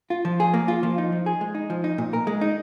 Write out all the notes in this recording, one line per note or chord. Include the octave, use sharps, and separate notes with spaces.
F4
F3
G#4
A#3
F4
F3
D#4
F3
G#4
G#3
D#4
F3
D#4
A#2
A#4
G#3
D#4